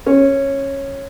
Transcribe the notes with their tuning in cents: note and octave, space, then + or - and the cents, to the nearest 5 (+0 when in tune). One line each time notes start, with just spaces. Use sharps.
C#4 -15